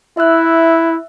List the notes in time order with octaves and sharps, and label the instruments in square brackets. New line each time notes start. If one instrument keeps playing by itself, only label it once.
[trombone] E4 [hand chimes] E5 E6 F#6